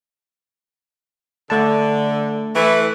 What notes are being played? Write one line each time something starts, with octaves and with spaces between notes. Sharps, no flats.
D3 A3 A5
E3 A3 B4